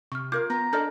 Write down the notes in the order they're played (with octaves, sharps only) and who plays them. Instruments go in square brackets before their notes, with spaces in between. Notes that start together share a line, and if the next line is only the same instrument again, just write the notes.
[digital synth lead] C3 [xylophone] C#6 F6
[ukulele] F4 A#4 F5 [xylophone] D6 G6 G#6
[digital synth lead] B3 [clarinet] A#5
[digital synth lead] D4 [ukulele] A4 C5 D5 [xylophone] D#5 F6 G6